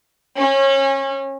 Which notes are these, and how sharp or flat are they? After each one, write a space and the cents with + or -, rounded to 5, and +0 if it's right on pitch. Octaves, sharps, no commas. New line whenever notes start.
C#4 -25